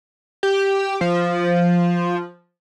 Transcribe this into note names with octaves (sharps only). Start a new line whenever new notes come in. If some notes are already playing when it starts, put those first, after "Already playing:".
G4
F3